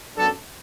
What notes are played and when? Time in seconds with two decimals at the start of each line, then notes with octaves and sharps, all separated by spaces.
0.17 F#2 F#3 B3 D4 A4